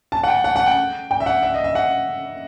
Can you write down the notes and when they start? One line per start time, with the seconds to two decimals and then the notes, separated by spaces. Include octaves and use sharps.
0.12 A5
0.23 F#5
0.28 G5
0.44 F#5
0.56 F#5
0.67 G5
1.11 G5
1.20 E5
1.26 F#5
1.43 E5
1.54 D#5
1.64 E5
1.75 F#5